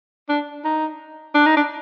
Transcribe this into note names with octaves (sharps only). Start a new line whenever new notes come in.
D4
D#4
D4
D#4
D4